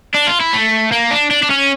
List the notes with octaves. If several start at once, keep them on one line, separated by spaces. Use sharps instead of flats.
D4
F4
E4
A3
A#3
D4
D4
D4
C#4